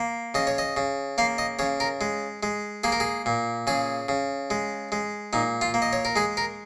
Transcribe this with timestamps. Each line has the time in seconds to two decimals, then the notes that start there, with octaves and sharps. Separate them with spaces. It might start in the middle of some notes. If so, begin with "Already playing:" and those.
Already playing: A#3
0.34 C#3 D#5
0.47 C#5
0.58 D#5
0.77 C#3
1.18 A#3 F5
1.38 D#5
1.59 C#3 C#5
1.80 A#4
2.01 G#3
2.43 G#3
2.84 A#3 G#4
2.92 A#4
3.00 G#4
3.26 A#2
3.67 C#3 G#4
4.09 C#3
4.50 G#3
4.92 G#3
5.33 A#2 D#4
5.61 F4
5.74 A#3
5.82 D#5
5.93 C#5
6.05 A#4
6.16 G#3 G#4
6.37 A#4